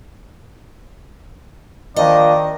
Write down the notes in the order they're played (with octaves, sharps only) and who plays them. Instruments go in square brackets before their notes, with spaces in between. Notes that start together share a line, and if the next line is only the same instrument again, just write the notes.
[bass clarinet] D#3 [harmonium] F3 A#3 D4 [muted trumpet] D5 [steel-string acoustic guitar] D#5